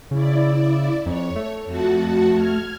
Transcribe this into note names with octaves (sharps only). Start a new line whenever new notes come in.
C#3 E4 D5
F2 C#5
A3
F2 F#4 A5
F6 G#6